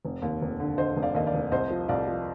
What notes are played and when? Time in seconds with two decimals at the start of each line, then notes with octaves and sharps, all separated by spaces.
0.05 F1
0.22 D#2
0.42 F1
0.60 D3
0.78 D3 C5 D#5
0.96 F1
1.02 D5 F5
1.15 D#2 D#5
1.27 D5 F5
1.34 F1
1.52 C2 C5 D#5
1.70 F3
1.89 C2 D5 F5
2.07 F3